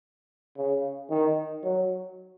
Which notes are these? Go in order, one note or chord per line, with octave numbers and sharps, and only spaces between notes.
C#3
D#3
F#3